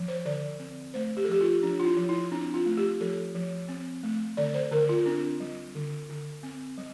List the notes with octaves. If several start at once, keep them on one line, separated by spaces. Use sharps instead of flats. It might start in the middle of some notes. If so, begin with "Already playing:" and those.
Already playing: F3
C5
D3 D5
C4
A3 C5
G4
A4
F3 G4
F4
F3 D4
F4
E4
F3
E4
C4 D4
F4
A3
G4
F3 A4
F3
C4
A3
D3 D5
C5
D3 A#4
F4
C4 D4
G3
D3
D3
C4
G3